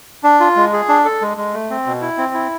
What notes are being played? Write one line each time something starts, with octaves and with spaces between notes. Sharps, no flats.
D4
F4
G#3
G#4
D4
A4
G#3
G#3
A3
C4
B2
E4
C4
E4